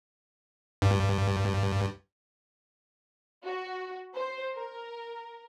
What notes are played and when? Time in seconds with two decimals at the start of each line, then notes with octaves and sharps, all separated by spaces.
0.82 G2
3.44 F#4
4.15 C5
4.55 A#4